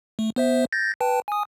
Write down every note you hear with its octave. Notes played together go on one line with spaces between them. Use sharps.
A3
B3 C5 E5
G6 A6 A#6
B4 G5 A5
G#5 D#6